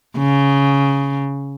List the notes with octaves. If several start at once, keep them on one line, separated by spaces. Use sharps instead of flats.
C#3